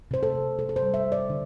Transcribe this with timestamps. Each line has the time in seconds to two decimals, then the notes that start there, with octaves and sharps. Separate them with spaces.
0.11 C3 C5
0.23 A4
0.35 C3
0.58 C3 A4
0.69 A4
0.76 C5
0.82 G3
0.94 E5
1.06 G3
1.12 D5
1.30 D3